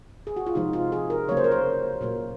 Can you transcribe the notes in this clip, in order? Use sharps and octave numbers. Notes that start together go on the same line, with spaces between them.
G#4
F#4
F4
C3 F3 G#3 D#4
F4
G#4
A#4
C#3 F#3 A#3 C#5
C5
A#4
C5
A#2 F#3 A#3